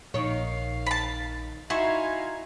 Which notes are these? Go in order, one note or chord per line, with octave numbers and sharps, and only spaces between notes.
A#1 D#3 C#5 F5
A5 B5
D#4 E4 F#4 F5 G#5 C6 G#6